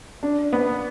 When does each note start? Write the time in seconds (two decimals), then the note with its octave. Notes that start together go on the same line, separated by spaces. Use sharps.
0.23 D4
0.53 B3